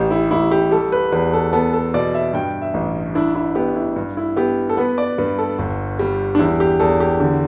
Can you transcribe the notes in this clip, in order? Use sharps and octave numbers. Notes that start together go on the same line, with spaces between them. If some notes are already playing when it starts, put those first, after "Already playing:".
Already playing: A1 G4
E4
A1 E4
G4
G3 A4
B4
E2 B4
A4
B3 A4
A4
B2 D5
E5
G2 G5
E5
A1
D4 E4
E4
B3 G4
E4
G2
E4
B3 G4
A4
B3 B4
D5
G2 B4
A4
G1
G3
D4
E2 E4
G4
E2 A4
G4
D3 G4